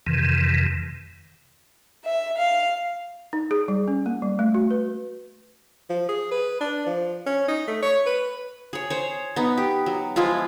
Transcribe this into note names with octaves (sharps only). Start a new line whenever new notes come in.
F2 C3 D#3 E3
E5
F5
D#4
G#4
G3
C#4
A#3
G3
A3
F#4
B4
F3
G#4
B4
D4
F3
C#4
D#4
A3
C#5
B4
G#4 C#5
C5 C#5
B3 D#4
G4
F#3
F3 G#3 E4 F4